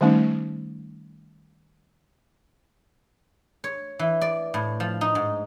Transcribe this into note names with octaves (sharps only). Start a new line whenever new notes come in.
D#3 G3 A3 C#4 D#4
C#5
E3
D5
A2
F3
D#4
G#2